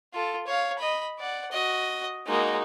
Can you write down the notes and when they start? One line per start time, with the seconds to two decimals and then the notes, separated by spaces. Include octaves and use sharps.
0.13 F4 A4
0.47 C#5 F5
0.79 D#5 B5
1.19 D5 F#5
1.53 F#4 D#5
2.27 G#3 A#3 D#4 F#4